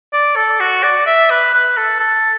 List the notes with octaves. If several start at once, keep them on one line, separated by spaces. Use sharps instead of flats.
D5
A4
F#4
D5
E5
B4
B4
A4
A4